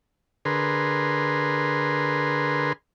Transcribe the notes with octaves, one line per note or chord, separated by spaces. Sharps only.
D3 G#4 A#4 B4 C6